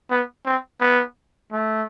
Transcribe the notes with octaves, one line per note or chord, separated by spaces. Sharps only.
B3
C4
B3
A3